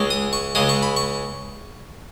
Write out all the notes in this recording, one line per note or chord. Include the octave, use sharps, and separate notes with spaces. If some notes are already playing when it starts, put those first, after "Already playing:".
Already playing: C#2 C#3 G#3
D#6
C#6
C#2 C#3 G#3 D#6
C#6
B5
C#6